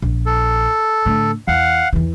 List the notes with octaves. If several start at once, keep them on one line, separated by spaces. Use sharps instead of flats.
A#1
A4
A2 D3
E2 F5 F#5
E2 E3